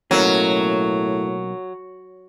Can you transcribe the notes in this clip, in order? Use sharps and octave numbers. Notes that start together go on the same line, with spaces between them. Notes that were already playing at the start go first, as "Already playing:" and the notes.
B1 A2 F#3 A#3 C#4